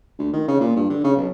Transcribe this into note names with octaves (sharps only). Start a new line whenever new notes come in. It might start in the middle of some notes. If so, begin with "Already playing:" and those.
D2
D#3
C#3
A#2
G2
D3
C#3
B1